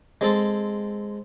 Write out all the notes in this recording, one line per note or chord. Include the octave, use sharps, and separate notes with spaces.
G#3 C4 A4